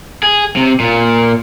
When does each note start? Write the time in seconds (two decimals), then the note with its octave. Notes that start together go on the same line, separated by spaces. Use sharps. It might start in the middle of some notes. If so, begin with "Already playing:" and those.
0.23 G#4
0.56 C3
0.80 A#2